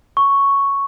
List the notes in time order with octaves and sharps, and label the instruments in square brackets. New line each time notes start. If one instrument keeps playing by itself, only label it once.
[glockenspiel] C#6